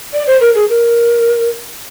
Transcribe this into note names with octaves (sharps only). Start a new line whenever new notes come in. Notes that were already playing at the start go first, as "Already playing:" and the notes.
D5
C5
A#4
G#4
A#4